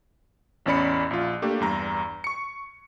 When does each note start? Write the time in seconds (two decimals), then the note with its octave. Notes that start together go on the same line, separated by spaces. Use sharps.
0.66 A1 E2 C#4 D5 B5 C#7
1.11 A#1 F4
1.42 A3 A#3 D4 G4
1.60 E2 G2 A#5
2.24 C#6 C#7